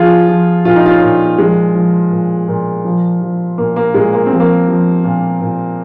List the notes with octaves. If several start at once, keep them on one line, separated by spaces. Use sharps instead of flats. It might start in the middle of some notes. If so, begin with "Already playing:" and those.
Already playing: F3 F4 G#4
F3
A#2 F4
D#4
C#4 F4
A#2
F3 G#3
F3
A#2
A#2
F3
F3
A#2 A#3
A#3
A#2 G#3
A#3
F3 C4
A#3
F3
A#2
A#2